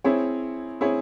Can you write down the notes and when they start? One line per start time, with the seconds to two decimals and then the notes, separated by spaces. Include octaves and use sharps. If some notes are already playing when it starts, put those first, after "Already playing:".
0.04 C4 E4 G#4 C#5
0.81 C4 E4 G#4 C#5